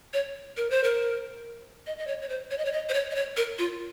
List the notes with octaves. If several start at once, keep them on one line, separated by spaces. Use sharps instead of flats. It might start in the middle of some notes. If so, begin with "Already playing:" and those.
C#5
A#4
C5
A#4
D#5
D#5
C#5
C#5
C5
C#5
D#5
C#5
D#5
C5
C#5
D#5
C#5
A#4
F4